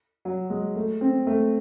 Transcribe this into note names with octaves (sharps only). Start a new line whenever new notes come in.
F#3
G#3
A3
C4
A3